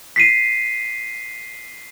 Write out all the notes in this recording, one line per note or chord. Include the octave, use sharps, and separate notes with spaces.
B6 C7 D#7